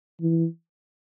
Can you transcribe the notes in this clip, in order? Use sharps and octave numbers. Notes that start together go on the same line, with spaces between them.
E3